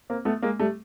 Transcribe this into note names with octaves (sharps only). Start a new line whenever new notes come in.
A#3 C4
A3 B3
G#3 A#3
G3 A3